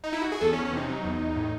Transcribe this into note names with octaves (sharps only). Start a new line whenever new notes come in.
D#4
E4
F#4
G#4
E2 A4
C#4
E2
C#4
C3 D#4
F#3
E2
E2
A2